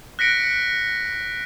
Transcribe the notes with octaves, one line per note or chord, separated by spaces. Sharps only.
F#6 A#6 B6 C#7 D7